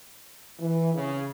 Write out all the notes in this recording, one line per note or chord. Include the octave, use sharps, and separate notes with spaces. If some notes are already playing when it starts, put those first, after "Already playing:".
E3
C#3